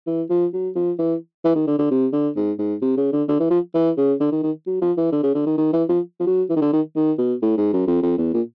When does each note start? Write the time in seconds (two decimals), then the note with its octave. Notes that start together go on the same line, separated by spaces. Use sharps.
0.07 E3
0.30 F3
0.53 F#3
0.75 F3
0.99 E3
1.45 E3
1.55 D#3
1.67 D3
1.78 D3
1.91 C3
2.13 D3
2.36 G#2
2.59 G#2
2.82 C3
2.97 C#3
3.12 D3
3.28 D3
3.40 E3
3.51 F3
3.74 E3
3.97 C#3
4.20 D3
4.32 D#3
4.43 D#3
4.67 F#3
4.81 F3
4.97 E3
5.12 D3
5.23 C#3
5.35 D3
5.46 D#3
5.57 D#3
5.73 E3
5.89 F3
6.20 F3
6.27 F#3
6.50 E3
6.56 D#3
6.61 D3
6.73 D#3
6.96 D#3
7.18 B2
7.42 A2
7.57 G#2
7.73 F#2
7.87 F2
8.03 F2
8.18 E2
8.34 A#2